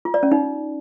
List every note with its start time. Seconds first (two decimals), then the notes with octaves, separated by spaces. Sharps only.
0.05 F4
0.14 D5
0.23 C#4
0.32 D#4